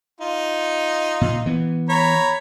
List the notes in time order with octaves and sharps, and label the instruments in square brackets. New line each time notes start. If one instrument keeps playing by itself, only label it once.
[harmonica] D#4 F4
[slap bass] A#2
E3 B3
[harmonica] C#5 A#5 B5